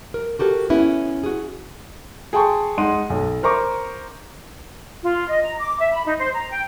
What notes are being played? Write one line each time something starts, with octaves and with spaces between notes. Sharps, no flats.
A#4
F#4 G4 A4 A#4
B3 C#4 E4
F#4 G#4
G#4 G5 A5 C6 C#6
G#3 D#4 F#5 C6 D#7
B1
A#4 C5 A#5 C#6 D6
F4
D#5
A#5
D6
E5
B5
D#4
C5
A#5
G5